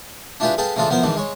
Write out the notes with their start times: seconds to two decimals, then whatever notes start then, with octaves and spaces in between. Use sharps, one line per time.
0.40 D4 E4 F4 G4 G#4 B4
0.58 G#4 A4 B4 F5 G5
0.76 C#3 E3 D4 F4 G#4 A4
0.90 F3 B3 E4 A#4 C5
1.03 G#2 D#3 E3 D4
1.16 G#3 C#5